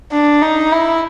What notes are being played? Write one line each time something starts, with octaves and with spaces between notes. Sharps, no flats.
D4
D#4
E4